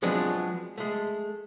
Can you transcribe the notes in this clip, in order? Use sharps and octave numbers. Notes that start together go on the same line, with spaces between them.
F3 F#3 G#3 B3 C4 D4
G#3 A3